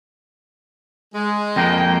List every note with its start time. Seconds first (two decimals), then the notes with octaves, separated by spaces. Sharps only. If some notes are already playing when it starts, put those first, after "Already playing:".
1.15 G#3
1.56 F2 A#3 G5